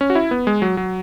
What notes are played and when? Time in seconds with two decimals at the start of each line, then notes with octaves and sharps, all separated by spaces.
0.01 C#4
0.10 F#4
0.15 E4
0.31 B3
0.47 G#3
0.62 F#3
0.77 F#3